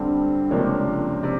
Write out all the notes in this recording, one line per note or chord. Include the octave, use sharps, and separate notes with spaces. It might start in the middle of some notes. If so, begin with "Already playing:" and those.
Already playing: G2 D3 G3 C4
C#2 C3 F3 A#3 D4 C#5
C3 D5